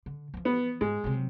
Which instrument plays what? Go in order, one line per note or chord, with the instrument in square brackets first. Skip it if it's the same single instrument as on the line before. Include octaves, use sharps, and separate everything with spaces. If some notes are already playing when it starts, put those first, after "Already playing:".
[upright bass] D3
E3 F3
[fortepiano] B3
[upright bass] G#2 [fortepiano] G#3
[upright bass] C3 F#3